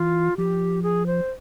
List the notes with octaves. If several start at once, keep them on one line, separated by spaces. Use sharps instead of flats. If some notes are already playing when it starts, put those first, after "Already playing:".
Already playing: E3 F4
F3 G4
G#4
C5